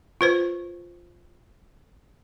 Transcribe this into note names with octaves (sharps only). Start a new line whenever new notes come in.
F4 B4 C5